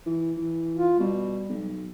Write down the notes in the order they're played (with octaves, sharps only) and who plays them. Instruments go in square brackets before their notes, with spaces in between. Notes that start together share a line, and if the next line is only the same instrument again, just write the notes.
[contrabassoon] E3
E3
[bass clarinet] F4
[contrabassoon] B2 [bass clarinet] G3
[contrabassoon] B1